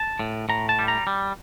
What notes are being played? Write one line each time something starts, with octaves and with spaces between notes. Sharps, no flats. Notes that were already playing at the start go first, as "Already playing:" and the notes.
Already playing: A5
A2
A2 A#5
A5
G3
A#5
G3